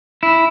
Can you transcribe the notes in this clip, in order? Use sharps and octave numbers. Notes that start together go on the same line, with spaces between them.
E4